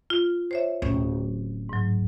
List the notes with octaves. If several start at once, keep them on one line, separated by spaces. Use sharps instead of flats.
F4
C5 C#5 E5
D1 C#4
G#2 F#3